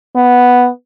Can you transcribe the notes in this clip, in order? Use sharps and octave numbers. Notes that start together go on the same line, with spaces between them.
B3